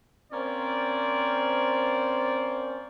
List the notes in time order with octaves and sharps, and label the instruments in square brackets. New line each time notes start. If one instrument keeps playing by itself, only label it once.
[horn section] A#3 C4 C#4 C5 D5